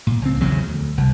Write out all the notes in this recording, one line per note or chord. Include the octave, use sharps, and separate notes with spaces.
A#2
C#2 C4
A#1 E2 C#3 F#3
D2
C2